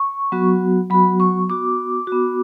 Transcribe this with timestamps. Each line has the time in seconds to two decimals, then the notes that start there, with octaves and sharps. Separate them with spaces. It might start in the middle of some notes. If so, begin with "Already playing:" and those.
Already playing: C#6
0.32 F#3 B3 F#4
0.90 F#3 B3 F#4 B5
1.20 C#6
1.49 B3 F#4 D6
2.07 F#4
2.12 B3